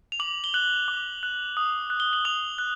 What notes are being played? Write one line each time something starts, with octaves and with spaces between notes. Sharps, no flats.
F7
D6 F#7
G7
F#6 F#7
D6
F#6
D#6
F#6
G7
F#7
D#6 F7
F#6